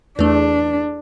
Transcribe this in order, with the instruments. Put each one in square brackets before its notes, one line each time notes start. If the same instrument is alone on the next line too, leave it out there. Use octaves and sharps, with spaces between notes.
[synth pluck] E2 A3 [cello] D4